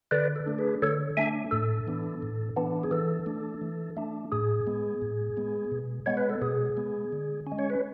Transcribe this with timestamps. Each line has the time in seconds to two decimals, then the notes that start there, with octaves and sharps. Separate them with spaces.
0.11 D3 B4 D5
0.36 A4
0.46 A3 D4
0.59 G#4 B4
0.82 D3 A4 C#5
1.17 A3 D4 E5 G#5
1.51 A2 A4
1.87 E3 B3 D4
2.22 A2
2.56 E3 B3 D4
2.84 G#4
2.91 E3 A4
3.26 A3 D4
3.61 E3
3.97 A3 D4
4.32 A2 G#4
4.67 G#3 B3
5.02 A2
5.37 G#3 B3
5.72 B2
6.06 G#3 B3 C#5
6.17 B4
6.30 A4
6.42 B2 G#4
6.77 G#3 B3
7.13 D3
7.47 C#4
7.52 G#3
7.59 C#5
7.70 B4